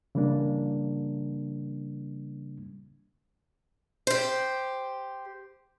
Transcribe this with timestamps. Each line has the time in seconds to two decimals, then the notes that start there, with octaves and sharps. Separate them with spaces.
0.15 C#3 E3 G3 A#3 D4
4.07 G4 C5